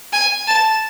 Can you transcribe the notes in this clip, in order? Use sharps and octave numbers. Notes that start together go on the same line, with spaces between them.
G#5
A5